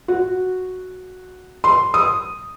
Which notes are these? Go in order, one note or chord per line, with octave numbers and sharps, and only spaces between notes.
F#4
C6
D#6